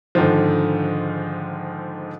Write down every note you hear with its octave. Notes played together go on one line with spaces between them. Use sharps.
G#2 D3 D#3 F3